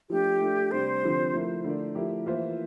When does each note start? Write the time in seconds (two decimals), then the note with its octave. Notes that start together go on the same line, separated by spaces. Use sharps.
0.10 F3 A3 D4 G4
0.41 A3 D4 A4 E5
0.71 C3 G3 D4 C5
1.03 D3 F3 C4 G4
1.34 F3 A3 E4 A#4
1.64 D3 A3 E4 A#4 D5
1.95 F3 A3 E4 G4 A#4
2.26 E3 A#3 F4 C5 E5